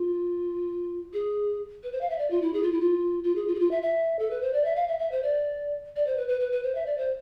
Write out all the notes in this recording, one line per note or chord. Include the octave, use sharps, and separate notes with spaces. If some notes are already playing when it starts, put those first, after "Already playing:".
Already playing: F4
G#4
B4
C5
F5
E5
D5
F4
E4
G#4
F4
E4
F4
F4
G#4
F4
G#4
F4
E5
E5
A4
B4
C5
D5
E5
F5
E5
E5
C5
D5
D5
C5
B4
B4
B4
B4
C5
E5
D5
C5